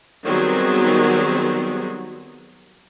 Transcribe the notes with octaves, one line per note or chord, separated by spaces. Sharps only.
D#3 F#3 G3 B3 C4 G#4